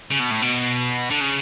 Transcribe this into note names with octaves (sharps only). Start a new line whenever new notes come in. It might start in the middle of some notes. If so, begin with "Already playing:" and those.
C#3
B2
A2
B2
D3
C#3